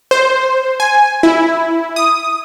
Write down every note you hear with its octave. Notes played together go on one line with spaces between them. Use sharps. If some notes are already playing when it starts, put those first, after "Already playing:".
C5
G#5
E4
D#6